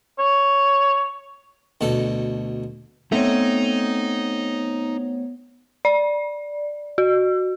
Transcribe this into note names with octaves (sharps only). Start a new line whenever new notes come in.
C#5
D2 B2 A4
A3 B3 C4 D#4 C#5
D5
F#4